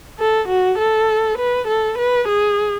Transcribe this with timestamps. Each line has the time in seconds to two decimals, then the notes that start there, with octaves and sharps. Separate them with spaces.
0.19 A4
0.49 F#4
0.78 A4
1.38 B4
1.68 A4
1.98 B4
2.28 G#4